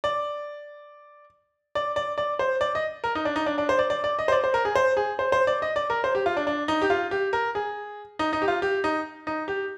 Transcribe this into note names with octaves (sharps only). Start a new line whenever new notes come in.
D5
D5
D5
D5
C5
D5
D#5
A#4
D#4
D4
D#4
D4
D4
C5
D5
D5
D5
D#5
C5
D5
C5
A#4
G#4
C5
G#4
C5
C5
D5
D#5
D5
A#4
C5
G4
F4
D4
D4
D#4
G4
F4
G4
A#4
G#4
D#4
D#4
G4
F4
G4
D#4
D#4
G4